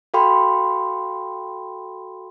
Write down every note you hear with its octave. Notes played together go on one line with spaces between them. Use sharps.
F#4 A4 F5 G5 B5 C6